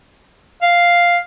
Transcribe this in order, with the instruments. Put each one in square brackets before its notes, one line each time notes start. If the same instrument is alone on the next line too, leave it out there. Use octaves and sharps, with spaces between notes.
[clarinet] F5